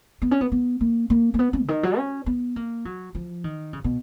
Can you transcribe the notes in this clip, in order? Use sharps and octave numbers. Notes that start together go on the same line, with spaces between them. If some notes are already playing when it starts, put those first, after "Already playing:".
B3
C#4
B3
B3
A#3
A#3
A#3
B3
C#4
C#3
D#3
F#3
C#4
B3
A#3
F#3
F3
D#3
C#3
B2